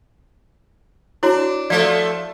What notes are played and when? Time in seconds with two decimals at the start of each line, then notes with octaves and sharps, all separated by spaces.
1.23 D4 E4 F#4 C#5
1.70 F3 A3 D5